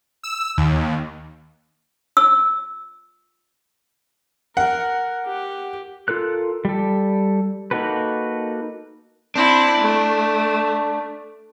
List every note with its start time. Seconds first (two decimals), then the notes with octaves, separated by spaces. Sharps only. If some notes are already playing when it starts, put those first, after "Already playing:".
0.23 E6
0.58 D#2
2.17 E6
4.57 A#4 F#5
5.26 G4
6.08 F4 A4 A#4 F#6
6.65 G3 A4
7.71 A#3 D#4 F#4 A4 B4
9.36 C4 D4 E4
9.81 A3